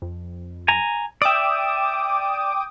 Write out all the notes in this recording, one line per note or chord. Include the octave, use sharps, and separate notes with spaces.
F2
G#5 A#5
D5 E5 G5 D6 D#6